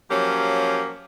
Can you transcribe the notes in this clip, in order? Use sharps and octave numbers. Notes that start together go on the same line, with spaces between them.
F3 F#3 A#3 C#4 G4